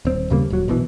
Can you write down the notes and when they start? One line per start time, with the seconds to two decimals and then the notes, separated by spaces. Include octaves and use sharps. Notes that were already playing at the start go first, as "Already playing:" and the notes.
0.05 D#1 C4
0.30 D#2 C#3 G3 A#3
0.50 D#1 F#3
0.68 A#1 B2 E3